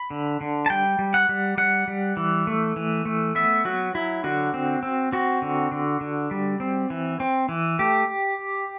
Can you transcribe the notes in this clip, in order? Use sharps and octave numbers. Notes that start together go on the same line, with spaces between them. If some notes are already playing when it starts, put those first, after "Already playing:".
Already playing: B5
D3
D3
A5
G3 G5
G3
F#5
G3
G3 F#5
G3
E3
A3
E3
A3
B3 E5
F#3 F#4
F#3 E4
D3 F#4
C4
C4
C4 F#4
D3
D3
D3
G3
C4
E3
C4
E3
A3 G4